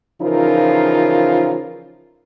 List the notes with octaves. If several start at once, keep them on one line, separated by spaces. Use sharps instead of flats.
C#3 E3 F3 D#4 F4 A#4